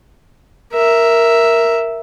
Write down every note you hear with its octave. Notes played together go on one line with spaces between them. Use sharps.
A#4 E5